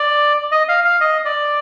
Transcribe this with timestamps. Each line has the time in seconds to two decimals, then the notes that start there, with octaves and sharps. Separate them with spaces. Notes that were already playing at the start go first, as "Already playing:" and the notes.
Already playing: D5
0.52 D#5
0.69 F5
0.85 F5
1.01 D#5
1.25 D5